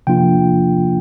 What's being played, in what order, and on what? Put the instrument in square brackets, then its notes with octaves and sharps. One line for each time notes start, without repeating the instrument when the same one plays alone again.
[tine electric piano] C3 F3 A#3 D4 F4 G5